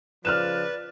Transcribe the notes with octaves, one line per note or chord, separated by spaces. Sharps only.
C#3 F3 B4 D5 F6 F#6 E7